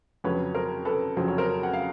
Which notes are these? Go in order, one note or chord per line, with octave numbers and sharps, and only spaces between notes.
F2 C#3 F#3 B4 C#5
A#4 C5
A4 B4
F2 C#3 F#3 C5
C#5
A#4 C5
F#5
F5